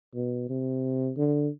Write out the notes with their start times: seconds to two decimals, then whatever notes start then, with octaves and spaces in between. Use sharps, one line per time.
0.15 B2
0.49 C3
1.17 D3